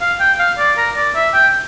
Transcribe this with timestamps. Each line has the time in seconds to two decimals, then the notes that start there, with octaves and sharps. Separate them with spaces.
0.01 F5
0.20 G5
0.39 F5
0.58 D5
0.77 A#4
0.96 D5
1.15 E5
1.33 G5